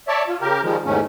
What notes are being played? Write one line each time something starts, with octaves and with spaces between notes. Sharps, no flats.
C#5 D5 E5 A5
F4
C#3 G4 A#4
D#3 F3 G3 G#3
E2 G#2 C3 D#3 A3 C#4